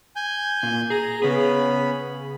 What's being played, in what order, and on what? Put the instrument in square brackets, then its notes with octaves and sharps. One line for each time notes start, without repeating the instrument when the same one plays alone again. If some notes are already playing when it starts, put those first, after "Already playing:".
[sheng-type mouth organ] G#5 G6
[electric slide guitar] A#2
[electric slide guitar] G#4 [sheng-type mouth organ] A#5
[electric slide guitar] C#3 G#4 [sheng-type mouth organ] B3 C#4 B5